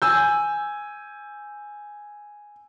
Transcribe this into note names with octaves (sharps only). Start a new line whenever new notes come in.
G#5 E6 G6